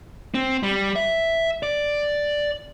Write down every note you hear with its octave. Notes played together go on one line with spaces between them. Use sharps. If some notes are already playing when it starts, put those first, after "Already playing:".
C4
G3
E5
D5